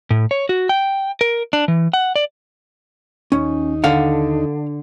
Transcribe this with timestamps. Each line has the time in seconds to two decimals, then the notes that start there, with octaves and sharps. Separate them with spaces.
0.11 A2
0.31 C#5
0.49 F#4
0.69 G5
1.21 A#4
1.53 D4
1.68 E3
1.93 F#5
2.16 D5
3.32 D#2 C#4 D#4
3.84 D3 F5 F#5